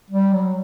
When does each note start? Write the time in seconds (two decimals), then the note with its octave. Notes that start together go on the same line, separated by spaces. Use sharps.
0.10 G3
0.33 F#3